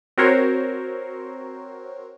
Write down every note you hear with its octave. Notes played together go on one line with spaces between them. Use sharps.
C4 F#4 A#4 C5 C#5